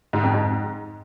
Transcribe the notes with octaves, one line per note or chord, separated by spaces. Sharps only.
G#2
F2
G#2